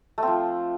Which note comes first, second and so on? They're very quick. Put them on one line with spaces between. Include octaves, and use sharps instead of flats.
A3 C4 F3